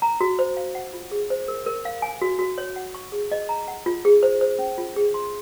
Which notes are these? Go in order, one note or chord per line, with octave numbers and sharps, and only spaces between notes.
A#5
F#4
C5
F5
F#5
F4
G#4
C5
A#4
A#4
F5
G#5
F#4
F#4
C#5
F#5
C#6
G#4
D#5
A#5
F#5
F4
G#4
C5
C5
C#4
F4
G#4
C6